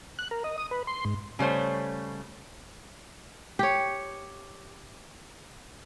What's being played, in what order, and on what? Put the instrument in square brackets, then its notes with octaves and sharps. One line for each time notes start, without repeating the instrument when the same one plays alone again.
[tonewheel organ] F#6
A#4
D#5
D#6
B4
C6
G#2
[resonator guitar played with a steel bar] C#3 G3 A3 C5 C#5
[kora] G4 C#5